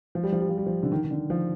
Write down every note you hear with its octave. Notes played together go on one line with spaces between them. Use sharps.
F3
G3
F3
G3
F3
G3
F3
D3
D#3
D#3
D3
F3